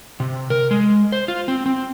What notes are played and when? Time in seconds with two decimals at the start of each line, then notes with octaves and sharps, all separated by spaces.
0.20 C3
0.50 A#4
0.71 G#3
1.12 C5
1.28 F4
1.48 C4
1.66 C4